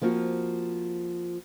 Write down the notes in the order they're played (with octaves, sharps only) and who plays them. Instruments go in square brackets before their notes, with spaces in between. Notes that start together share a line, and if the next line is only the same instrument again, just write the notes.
[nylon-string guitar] F3 A#3 C4 F4 F#4